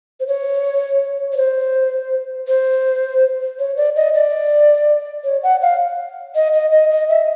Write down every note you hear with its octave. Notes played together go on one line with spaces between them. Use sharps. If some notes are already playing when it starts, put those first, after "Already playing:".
C5
C#5
C#5
C5
C5
C#5
D5
D#5
D5
C#5
F#5
F5
D#5
D#5
D#5
D#5
E5